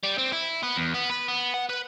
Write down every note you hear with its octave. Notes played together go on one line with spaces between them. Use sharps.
G3
C4
E4
B3
E2
B3
B4
B3
F#5
B4